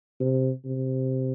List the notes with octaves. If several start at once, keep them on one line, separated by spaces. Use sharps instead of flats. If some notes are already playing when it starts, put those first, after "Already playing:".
C3
C3